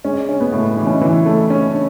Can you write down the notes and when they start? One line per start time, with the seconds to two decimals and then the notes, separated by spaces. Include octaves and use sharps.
0.05 G#3 C#4
0.29 C#4
0.40 B3
0.53 A2
0.77 E3 D#4
0.86 C#4
0.96 D#4
1.01 E3
1.26 A3
1.50 C#4
1.74 C#4